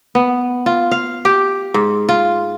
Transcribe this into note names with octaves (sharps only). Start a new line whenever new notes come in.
B3
F4
F5
G4
G#2
F4